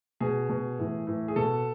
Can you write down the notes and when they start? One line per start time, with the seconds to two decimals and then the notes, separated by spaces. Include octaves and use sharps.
0.20 B2 G#4
0.49 B2
0.79 A2 E3
1.07 A2 E3
1.28 G#4
1.36 B2 A4